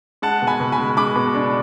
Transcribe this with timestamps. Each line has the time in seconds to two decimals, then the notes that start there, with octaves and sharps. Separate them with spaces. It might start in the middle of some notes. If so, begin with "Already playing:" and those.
0.22 G#3 F#5 A5
0.42 B2
0.47 G#5 B5
0.60 B2
0.72 G#5 B5
0.79 G#3
0.97 G#3 B5 D6
1.16 B2
1.35 D4